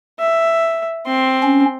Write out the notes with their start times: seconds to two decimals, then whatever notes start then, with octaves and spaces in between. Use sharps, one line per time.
0.20 E5
1.06 C4 C6
1.42 C#4